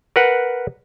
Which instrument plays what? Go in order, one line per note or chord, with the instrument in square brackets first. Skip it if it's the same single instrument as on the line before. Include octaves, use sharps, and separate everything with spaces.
[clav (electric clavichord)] A#4 B4 F#5